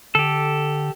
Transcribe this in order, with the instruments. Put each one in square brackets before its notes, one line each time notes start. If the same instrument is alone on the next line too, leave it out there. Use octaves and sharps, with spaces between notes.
[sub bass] D3 [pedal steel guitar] G4 A4